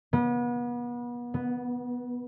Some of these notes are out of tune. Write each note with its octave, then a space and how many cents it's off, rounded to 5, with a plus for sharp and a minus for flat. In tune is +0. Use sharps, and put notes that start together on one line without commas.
B3 -35
B3 +0